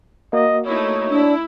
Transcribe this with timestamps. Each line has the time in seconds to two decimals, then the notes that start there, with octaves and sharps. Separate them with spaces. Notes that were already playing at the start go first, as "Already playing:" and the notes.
0.33 A#3 F#4 D#5
0.66 A3 D#4 E4 C#5
1.10 D4 E4